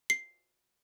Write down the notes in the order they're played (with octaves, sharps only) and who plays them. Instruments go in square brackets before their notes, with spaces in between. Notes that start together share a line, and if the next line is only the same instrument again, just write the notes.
[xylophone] C7